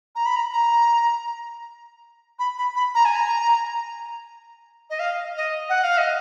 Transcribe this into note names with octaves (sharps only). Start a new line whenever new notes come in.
A#5
B5
A#5
A#5
B5
B5
B5
A#5
G#5
A#5
D#5
F5
D#5
F#5
F5
D#5